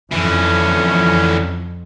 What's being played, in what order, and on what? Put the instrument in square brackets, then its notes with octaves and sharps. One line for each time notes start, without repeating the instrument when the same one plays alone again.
[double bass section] F2 [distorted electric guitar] D3 E3 [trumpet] C#4